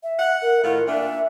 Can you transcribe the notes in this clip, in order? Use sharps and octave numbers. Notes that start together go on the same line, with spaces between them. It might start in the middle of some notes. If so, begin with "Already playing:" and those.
E5
F#5
A#4
A2 D#3 F4 A#4
A#2 D4 E5